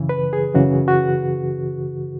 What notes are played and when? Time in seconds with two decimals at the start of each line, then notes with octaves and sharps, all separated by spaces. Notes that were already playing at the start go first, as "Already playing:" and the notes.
Already playing: F#2 C#3 E3
0.09 B4
0.33 G#4
0.55 F#2 C#3 E3 F#4
0.88 F#4